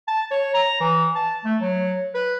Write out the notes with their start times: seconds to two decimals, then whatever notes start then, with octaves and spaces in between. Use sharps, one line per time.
0.08 A5
0.31 C#5
0.54 A#5
0.81 E3
1.16 A5
1.45 A3
1.61 F#3
2.15 B4